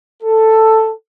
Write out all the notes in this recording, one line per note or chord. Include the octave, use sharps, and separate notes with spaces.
A4